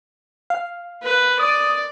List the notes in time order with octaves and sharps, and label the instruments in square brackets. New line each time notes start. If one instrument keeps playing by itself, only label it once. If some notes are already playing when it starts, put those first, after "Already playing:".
[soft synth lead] F5
[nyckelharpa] B4
[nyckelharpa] D5 [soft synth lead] D#6